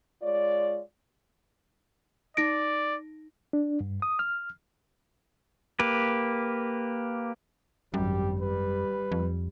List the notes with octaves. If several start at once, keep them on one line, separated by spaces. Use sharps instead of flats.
G#3 F4 C#5 D5
D#4 D5 A#6 D7
D4
G2
D#6
F6
A#3 G4 B4
G#1 F#2 G3 G4
G3 B4
F2